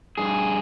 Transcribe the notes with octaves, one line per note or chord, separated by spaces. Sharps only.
G2 G#4